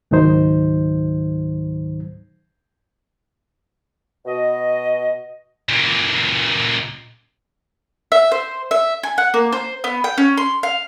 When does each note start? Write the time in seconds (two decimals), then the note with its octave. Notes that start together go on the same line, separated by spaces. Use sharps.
0.11 C#2 G#2 D#3 F#3 D#4 C5
4.26 B2 D#5
5.69 C#2 A#2
8.12 E5
8.32 C5
8.71 E5
9.03 G#5
9.18 F#5
9.34 A#3
9.52 C5
9.84 B3
10.04 G5
10.18 C#4
10.38 C6
10.63 F5